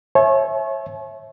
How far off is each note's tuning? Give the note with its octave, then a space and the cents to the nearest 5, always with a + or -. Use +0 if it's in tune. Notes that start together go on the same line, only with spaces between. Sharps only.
C#5 -30 E5 +0 G#5 +45